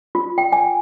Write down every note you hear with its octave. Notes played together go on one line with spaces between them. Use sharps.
F4
G5
G#5